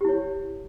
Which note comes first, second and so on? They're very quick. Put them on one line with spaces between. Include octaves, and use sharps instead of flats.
G4 E4 C#5